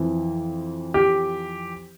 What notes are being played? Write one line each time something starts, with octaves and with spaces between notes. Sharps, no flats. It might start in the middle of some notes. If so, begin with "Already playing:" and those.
Already playing: F2 E3
G4